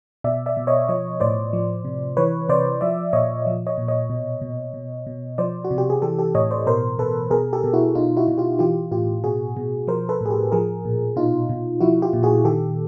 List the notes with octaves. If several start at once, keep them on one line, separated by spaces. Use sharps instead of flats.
B2 D5 E5
D5 E5
B2
C#5 D#5
F3 C#5 D#5
A2 C5 D5
F3
C3
E3 B4 C#5
C3 C5 D5
F3 D5 E5
A#2 C#5 D#5
F3
C#5 D#5
A#2
C#5 D#5
B2
B2
B2
B2
F3 C5 D5
F#4
C3
G4
G#4
E3 G4 A4
G4 A4
A2 C#5 D#5
C5 D5
B2 A#4 C5
B2 A4 B4
B2 G#4 A#4
G4 A4
B2
E4 F#4
B2 D#4 F4
E4 F#4
B2
F4 G4
E3 F4 G4
A2 F4 G4
B2 F#4 G#4
B2
F3 A#4 C5
A4 B4
A2 G#4
G4 A4
F3 G#4 A#4
A#2
B2 D#4 F4
B2
F3 E4 F#4
F4 G4
A#2
F#4 G#4
D#3 G4 A4